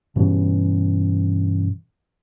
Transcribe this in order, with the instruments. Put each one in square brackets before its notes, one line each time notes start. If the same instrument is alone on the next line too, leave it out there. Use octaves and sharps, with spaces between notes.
[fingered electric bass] G2 B2 E3 C#4